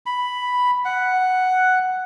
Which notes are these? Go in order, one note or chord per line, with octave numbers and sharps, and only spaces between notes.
B5
F#5